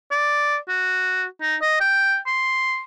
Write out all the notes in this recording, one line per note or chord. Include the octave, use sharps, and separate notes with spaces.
D5
F#4
D#4
D#5
G5
C6